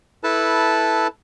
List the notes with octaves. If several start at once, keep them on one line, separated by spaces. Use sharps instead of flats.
E4 A4 B4 A5